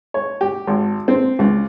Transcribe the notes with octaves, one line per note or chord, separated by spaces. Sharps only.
C#5
G4
G#1
C4
C#2